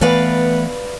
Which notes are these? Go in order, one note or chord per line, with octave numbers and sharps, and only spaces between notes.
E3 A3 B3 B4 D5 F5